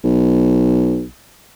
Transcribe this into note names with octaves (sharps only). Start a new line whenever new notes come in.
B1